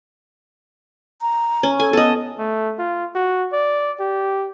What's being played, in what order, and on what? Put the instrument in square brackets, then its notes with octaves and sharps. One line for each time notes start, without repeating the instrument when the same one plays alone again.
[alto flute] A#5
[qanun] C#4
[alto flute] A4 [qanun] G#5
[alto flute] B3 [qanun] A4 D#5
[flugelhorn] A3
F4
F#4
D5
G4